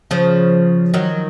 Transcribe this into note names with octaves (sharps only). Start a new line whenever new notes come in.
C#3 F3
D#3 F#3